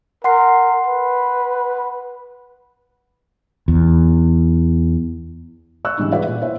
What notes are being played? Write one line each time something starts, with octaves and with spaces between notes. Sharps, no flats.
A#4 F#5 C6 C7
B4
E2
D5 C#6 E6 F#6
G#2 C#3 E3 G3 D4 D#4
F4 G#4 B4 D5 E5 F#5
A#2
E4 C5 C#5 E5